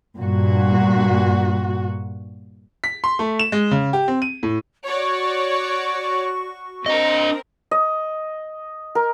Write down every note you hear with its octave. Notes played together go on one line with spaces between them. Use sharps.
G2 A#2 F#4
B6
C6
A3
E7
G#3
C#3
G4
C4
D#7
A2
F#4 C#5 D5 C#6
C4 D4 A#4 D#5
D#5
A#4